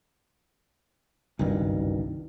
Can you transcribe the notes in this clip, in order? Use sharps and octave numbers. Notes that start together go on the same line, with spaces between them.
F#1 C2 G2 D#3